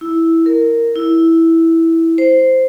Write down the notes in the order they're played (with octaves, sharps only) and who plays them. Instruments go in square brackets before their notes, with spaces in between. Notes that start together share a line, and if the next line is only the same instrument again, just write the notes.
[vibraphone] E4
A#4
E4
C5